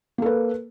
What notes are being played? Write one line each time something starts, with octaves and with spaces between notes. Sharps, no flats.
A#3 A4 B4